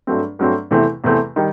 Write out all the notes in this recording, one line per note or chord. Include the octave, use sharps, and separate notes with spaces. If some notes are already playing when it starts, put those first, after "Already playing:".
G2 F#3 A3 C4
G2 F#3 A3 C4
E2 C3 E3 A3 C4
E2 C3 E3 A3 C4
D#3 G3